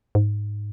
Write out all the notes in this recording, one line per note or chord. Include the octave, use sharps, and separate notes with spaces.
G#2